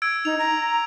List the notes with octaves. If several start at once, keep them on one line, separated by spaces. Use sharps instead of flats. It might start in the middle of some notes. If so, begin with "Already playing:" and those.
E6 G#6 D7
D#4 F7
A#5